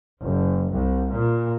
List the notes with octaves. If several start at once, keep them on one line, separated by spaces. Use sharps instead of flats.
F#1
C2
A#2